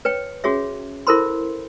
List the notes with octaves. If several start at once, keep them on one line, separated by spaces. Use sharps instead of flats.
B4 C#5 G5
C#4 F#4 G#4 C#5 E5
E4 A4 A#4 C5 B5 C6